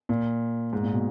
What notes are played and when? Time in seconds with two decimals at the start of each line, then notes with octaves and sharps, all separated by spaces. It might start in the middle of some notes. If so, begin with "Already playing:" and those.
0.09 A#2
0.73 G#2
0.83 A#2
0.94 B2